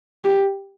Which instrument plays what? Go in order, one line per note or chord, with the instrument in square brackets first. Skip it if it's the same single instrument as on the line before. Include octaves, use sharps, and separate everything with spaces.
[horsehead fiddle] G4